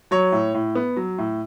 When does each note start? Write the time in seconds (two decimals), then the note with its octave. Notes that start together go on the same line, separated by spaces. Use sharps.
0.11 F#3 C#5
0.32 A2
0.54 A2
0.75 B3
0.96 F#3
1.18 A2